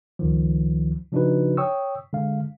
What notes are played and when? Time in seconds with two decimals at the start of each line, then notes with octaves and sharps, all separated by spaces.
0.19 C#2 D#3 F3
1.12 C#3 F3 D4 D#4 F#4 B4
1.57 C#5 G5 C#6 D#6 E6
2.13 D3 G#3 F5